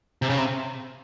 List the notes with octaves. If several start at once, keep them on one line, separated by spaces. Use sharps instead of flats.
C3
C#3
C3